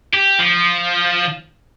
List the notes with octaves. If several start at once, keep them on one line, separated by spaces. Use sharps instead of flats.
G4
F3